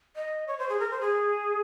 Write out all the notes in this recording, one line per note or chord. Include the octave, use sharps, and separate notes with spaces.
D#5
C#5
C5
G#4
A#4
C5
G#4